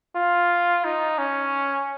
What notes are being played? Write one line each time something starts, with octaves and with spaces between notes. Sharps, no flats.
F4
D#4
C#4